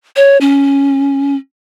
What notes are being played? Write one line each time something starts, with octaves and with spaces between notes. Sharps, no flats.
C#5
C#4